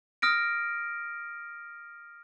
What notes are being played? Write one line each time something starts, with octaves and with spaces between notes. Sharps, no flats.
D#6 F6 A#6 D7